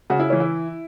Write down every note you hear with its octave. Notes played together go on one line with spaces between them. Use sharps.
C#3 F#4
E4
E3 C#4
E4